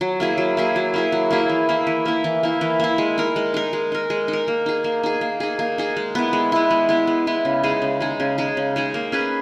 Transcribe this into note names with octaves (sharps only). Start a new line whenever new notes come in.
F#3
A#3 E4 G#4
F#3
A#3 E4 G#4
F#3
A#3 E4 G#4
F#3
A#3 E4 G#4
E3
A#3 E4
E3
A#3 E4
E3
A#3 E4
E3
A#3 E4
G#3
D#4 A#4
G#3
D#4 A#4
G#3
D#4 A#4
G#3
D#4
A#4
A#3
D#4 G#4
A#3
D#4 G#4
A#3
D#4 G#4
A#3
D#4 G#4
G#3
B3 E4
G#3
B3 E4
G#3
B3 E4
G#3
B3 E4
C#3
G#3 D#4 G#4
C#3
G#3 D#4 G#4
C#3
G#3 D#4 G#4
C#3
G#3 D#4 G#4
A#3
C#4 G#4 B4